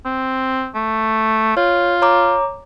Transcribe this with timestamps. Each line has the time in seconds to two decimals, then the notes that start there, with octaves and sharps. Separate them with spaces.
0.05 C4
0.75 A3
1.57 F4 C#5
2.02 C#5 A#5 D6